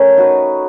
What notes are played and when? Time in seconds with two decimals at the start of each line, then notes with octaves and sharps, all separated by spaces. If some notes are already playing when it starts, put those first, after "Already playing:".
Already playing: A3 C#4 A#4
0.17 D#4 F#4 B4